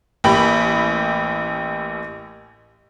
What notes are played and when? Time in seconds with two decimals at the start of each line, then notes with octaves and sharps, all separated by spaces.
0.24 A1 A#3 G4 B5 F#7